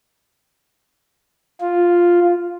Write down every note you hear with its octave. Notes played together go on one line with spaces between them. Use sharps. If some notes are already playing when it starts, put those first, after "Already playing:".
F4